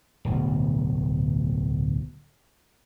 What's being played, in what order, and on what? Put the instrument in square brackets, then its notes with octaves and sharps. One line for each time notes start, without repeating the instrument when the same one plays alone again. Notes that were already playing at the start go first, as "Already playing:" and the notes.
[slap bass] D1 B1